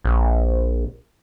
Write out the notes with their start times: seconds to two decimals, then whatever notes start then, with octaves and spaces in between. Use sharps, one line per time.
0.04 A#1